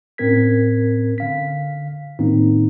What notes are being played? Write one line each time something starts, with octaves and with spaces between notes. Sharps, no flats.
A2 C4 C#4 A#4 G#6 B6
D3 F5 B6
A2 D#3 A#3 C4 C#4 D#4